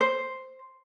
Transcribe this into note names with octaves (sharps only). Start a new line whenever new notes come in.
C5